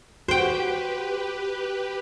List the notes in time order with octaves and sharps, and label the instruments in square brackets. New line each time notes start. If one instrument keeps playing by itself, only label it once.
[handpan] F#4 [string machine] G4 B4 [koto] C5 G5